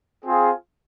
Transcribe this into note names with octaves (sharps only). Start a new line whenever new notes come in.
C4 F4 G#4